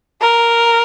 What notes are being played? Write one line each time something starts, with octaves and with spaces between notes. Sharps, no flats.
A#4